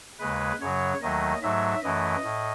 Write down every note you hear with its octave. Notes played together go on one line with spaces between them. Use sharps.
D#2 C#3 G#3 B4
F#2 C#3 F#3 C#5
D#2 D#3 F#3 A3 D#5
G#2 F#3 A3 E5
F#2 E3 A3 D#5
A2